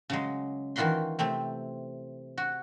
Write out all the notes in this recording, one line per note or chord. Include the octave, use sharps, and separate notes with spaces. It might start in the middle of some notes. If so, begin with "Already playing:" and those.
C#3 F#3 G#3
D#3 E3 F4 F#4 B5 C6
C3 A3 C4
F#4